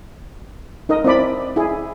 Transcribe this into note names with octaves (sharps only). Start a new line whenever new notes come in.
D#4 A#4 D#5
C4 E4 D5 B5
E4 G#4